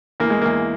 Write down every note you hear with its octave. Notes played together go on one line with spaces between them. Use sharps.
E2 A#3
G#3
E2 A#3